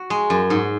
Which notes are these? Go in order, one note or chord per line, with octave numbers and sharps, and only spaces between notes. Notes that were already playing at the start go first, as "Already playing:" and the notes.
Already playing: F#4
G#3
F#2
G#2